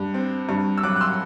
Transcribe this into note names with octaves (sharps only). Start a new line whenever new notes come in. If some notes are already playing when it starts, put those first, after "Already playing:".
Already playing: G2
C4
G2
E6
F#3 D6 F#6
F#6
C6 E6